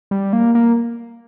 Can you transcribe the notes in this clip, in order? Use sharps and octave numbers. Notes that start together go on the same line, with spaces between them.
G3
A#3
A#3